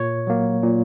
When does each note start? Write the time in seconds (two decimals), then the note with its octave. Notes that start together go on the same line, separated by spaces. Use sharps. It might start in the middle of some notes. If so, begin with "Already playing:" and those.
Already playing: A#2 C#5
0.27 F#3 A#3
0.63 A#2